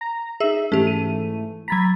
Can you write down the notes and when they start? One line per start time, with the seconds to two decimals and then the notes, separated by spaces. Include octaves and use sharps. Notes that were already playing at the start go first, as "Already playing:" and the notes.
0.01 A#5
0.40 D#4 G#4 E5
0.72 G#2 E3 A3 C#4 G4
0.87 D#7
1.68 F#3 A#5 B5 G#6 A6 B6